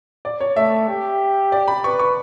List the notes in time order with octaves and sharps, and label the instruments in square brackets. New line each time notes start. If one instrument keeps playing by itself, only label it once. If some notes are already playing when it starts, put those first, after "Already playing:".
[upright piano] D5
C#5
[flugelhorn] A3 [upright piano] E5
[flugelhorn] G4
[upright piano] D5
B5
[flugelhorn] B4 [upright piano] C#6
[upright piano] C#6